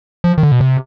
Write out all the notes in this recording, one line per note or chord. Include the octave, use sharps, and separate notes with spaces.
F3
D#3
D3
B2
C3